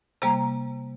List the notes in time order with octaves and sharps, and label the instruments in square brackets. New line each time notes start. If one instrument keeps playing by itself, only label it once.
[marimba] C3 G3 A#3 A#5